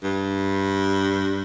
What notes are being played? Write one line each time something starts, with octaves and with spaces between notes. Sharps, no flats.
G2